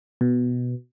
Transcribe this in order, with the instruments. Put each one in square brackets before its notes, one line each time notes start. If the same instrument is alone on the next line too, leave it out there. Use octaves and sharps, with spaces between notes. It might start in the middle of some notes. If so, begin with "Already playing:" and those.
[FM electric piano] B2